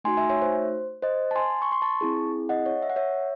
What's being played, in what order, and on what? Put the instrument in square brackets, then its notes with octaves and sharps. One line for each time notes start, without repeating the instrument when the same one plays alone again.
[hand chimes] A3 D#4 F#4 G#5 C6
E5 G#5
C#5 E5
C5
C5 D#5
A5
G#5 C6
C#6
C6
A5 C#6
C4 E4 G#4
D#5 F#5
C#5
E5
F#5
C#5 E5